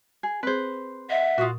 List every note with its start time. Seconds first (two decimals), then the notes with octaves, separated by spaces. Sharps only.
0.23 G#4
0.43 C4 G#4 B4 C5
1.10 D#5 E5 F#5
1.38 A#2 F4 F#4 C#6 D#6